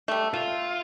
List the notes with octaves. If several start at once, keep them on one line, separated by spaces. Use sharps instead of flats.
G3 A3
F4 E5